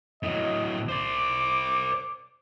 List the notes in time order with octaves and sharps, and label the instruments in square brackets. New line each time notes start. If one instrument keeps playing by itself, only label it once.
[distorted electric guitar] A2 F#3 [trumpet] D#5
[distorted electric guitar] C5 D5 [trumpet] D6